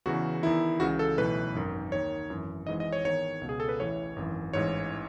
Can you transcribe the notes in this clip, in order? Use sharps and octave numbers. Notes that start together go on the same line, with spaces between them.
E2 C#3 E3 F#4
E2 D#3 E4
C#2 C#3 E3 F#4
A4
B1 A2 E3 B4
G#1 F#2 D#3
D#2 D#3 C#5
G#1 F#2 E3
G#1 G#2 E3 D#5
D#5
C#5
E2 D#3 C#5
C#2 B2
G#4
A4
B4
A1 A2 E3 C#5
G#1 F#2 E3
A1 G#2 E3 C#5